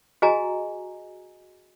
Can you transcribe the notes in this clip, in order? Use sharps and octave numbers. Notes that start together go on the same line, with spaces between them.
F#4 G#4 D#5 G#5 A#5